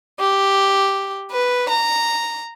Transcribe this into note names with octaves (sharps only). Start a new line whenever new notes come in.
G4
B4
A#5